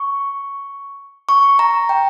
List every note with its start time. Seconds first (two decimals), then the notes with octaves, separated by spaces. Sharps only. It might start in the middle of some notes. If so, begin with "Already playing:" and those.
Already playing: C#6
1.29 C#6
1.59 A#5
1.89 G5